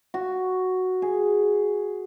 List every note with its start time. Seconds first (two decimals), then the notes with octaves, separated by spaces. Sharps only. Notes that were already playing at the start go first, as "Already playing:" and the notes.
0.14 F#4
1.02 G#4